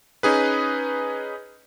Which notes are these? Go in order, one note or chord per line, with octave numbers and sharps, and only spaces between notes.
C#4 D#4 G#4 B4